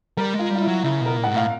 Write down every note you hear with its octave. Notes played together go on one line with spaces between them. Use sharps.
G3 A#4
G#3
F4
G3
F4
E4
F#3
C#3 E4
B2
A#4
A#2
G#2 F#5
A2 F5